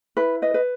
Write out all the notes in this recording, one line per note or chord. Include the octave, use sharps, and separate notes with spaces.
E4 B4
B4 D#5
B4